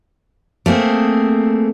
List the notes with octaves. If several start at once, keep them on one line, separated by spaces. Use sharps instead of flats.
A3 A#3 C4 G#4